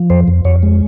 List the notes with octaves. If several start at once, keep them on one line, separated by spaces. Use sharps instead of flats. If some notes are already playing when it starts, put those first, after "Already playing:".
Already playing: F3
F2 C5
F2
F2 C#5
G#3